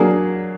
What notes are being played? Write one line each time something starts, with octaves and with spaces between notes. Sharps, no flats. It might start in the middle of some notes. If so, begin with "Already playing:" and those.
Already playing: F#3 A#3 D4 G#4